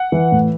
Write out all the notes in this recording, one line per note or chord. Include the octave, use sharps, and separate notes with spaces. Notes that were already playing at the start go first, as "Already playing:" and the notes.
Already playing: F#5
E3
A2